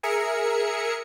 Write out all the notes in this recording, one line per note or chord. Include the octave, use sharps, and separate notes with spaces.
G#4 A#4 E5 C#7